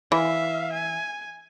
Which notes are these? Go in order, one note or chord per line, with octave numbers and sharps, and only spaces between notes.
E3 E5 F5
G#5